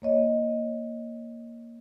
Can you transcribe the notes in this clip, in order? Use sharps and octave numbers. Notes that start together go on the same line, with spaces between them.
A#3 C#5 D#5